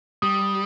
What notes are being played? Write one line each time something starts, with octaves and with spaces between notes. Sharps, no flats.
G3 D#6